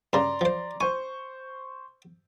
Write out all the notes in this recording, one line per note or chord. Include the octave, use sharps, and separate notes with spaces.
G2 C#3 D5 A#5 C6
F3 C5
C5 G#5 C#6